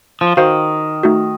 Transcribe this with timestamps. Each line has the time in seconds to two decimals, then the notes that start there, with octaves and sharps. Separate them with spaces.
0.21 F3
0.37 D#3 F#4 C5 F5
1.03 A3 D#4 F#4